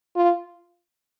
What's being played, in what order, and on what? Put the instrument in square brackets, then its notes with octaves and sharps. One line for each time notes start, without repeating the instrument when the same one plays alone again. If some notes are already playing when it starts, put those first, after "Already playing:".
[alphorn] F4